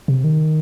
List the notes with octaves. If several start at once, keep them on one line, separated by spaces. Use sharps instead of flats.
C3
D#3